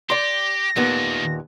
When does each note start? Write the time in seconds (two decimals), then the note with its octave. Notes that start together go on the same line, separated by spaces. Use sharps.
0.10 G4 D5 C6 A#6
0.76 D#2 A#2 D#3 A3 B3